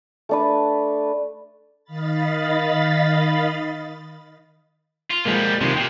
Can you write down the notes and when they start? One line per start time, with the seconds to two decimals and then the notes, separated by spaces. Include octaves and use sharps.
0.29 A3 D4 B4
1.84 D#3 D#5 F5 B5 A6
5.10 F4
5.25 B2 F3 G3 G#3 A#3
5.61 G2 C3 D#3 F3 G#3
5.76 A#2 G5